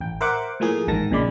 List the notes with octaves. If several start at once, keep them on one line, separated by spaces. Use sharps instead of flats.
A1 G5
A#4 C5 E5 F#5 D6
A2 F3 A#3 G#4
A1 G#2 D#3 A5 A#6
A#1 A#2 C#3 G#3 D5 B5